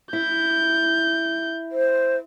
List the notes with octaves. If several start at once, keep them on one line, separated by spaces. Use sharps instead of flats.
E4 G6
C5